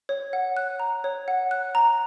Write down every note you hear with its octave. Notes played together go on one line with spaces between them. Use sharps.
C#5
F#5
F#6
A#5
C#5
F#5
F#6
A#5